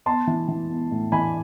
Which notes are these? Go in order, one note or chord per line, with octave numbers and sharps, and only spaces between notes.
B3 A5 C6
E3
E3
B3
A2
E3 G#5 B5